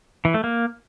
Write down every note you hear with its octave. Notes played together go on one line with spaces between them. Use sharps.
E3
A3
A#3